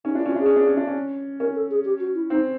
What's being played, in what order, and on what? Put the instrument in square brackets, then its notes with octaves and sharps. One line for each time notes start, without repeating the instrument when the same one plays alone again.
[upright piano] C#4 [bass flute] D#4
[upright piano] D4 [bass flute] E4
[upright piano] C#4 [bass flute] F4
[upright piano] D4 [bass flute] G#4
[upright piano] C#4
D4
C#4
D4
C#4
[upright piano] C#4 [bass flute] A#4
[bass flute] A4
G#4
G4
F#4
E4
[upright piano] C4 [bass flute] D#4